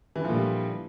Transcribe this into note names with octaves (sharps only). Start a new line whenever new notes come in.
A#2 D3 E3 F3 G3